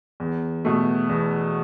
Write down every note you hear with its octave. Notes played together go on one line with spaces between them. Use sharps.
E2
B2 A3
E2